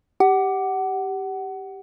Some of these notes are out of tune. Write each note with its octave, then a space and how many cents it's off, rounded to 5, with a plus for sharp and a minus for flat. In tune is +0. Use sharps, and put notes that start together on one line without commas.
G4 +0 F#5 +25